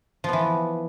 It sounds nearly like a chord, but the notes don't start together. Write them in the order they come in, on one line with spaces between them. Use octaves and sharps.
F3 B3 E3